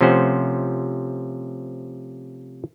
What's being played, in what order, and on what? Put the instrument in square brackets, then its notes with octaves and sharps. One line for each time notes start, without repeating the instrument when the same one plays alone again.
[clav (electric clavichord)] C3 F3 A3 C#4 C5 F#5